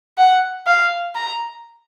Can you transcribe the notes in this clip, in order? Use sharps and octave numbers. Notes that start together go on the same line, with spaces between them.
F#5
F5
A#5